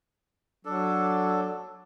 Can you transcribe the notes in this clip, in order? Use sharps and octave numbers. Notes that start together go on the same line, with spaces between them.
F#3 D4 A4